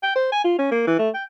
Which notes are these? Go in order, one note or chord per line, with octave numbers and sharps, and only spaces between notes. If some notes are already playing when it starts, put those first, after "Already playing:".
G5
C5
G#5
F4
C#4
A#3
E3
A3
G5